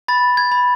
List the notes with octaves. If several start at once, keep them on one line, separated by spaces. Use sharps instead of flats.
B5 A6
G#6
B5